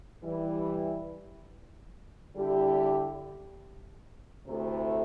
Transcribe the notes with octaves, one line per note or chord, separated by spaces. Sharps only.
E3 G3 E4
D3 G3 E4 G4
D2 C3 A3 E4 A4